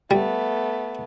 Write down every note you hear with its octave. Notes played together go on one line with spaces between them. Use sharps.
G3 A3 B3